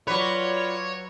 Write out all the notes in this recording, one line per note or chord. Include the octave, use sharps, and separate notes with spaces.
F#3 F4 B4 C#5 D5